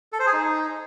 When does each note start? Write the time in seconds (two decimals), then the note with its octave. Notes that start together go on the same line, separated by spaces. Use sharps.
0.13 A4
0.19 C5
0.26 G#4
0.33 D#4